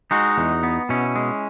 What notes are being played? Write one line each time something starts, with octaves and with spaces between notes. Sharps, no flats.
G#3 D#4 F#4
E2
B3
B2 C#4 E4
G#3